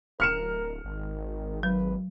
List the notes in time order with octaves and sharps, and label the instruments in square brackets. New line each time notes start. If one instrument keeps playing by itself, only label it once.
[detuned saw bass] D1 [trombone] A#4 [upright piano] F6 C#7 E7
[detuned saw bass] G#1 [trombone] D#3
[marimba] F#3 [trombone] B4